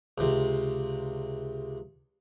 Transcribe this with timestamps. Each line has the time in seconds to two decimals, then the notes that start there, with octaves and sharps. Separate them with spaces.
0.18 C#2 C3